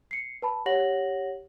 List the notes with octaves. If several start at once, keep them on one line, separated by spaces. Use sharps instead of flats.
C7 C#7
B4 A5 B5
G4 C#5 F#5 A#6 F#7